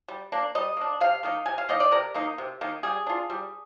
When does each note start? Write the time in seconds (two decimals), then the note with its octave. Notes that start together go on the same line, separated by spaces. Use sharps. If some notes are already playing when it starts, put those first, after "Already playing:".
0.08 G3
0.32 A#3 D4
0.55 G3 D#5
0.77 A#3 D4
1.00 C3 F5
1.23 D#3 A#3 D#4
1.46 C3 G#5
1.58 F5
1.69 D#3 A#3 D#4 D#5
1.80 D5
1.91 C3 A#4
2.14 D#3 A#3 D#4
2.38 C3
2.61 D#3 A#3 D#4
2.83 G3 G#4
3.06 D4 F4
3.30 G3